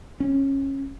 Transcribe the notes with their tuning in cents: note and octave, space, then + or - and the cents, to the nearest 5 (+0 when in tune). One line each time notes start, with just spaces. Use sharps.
C#4 -20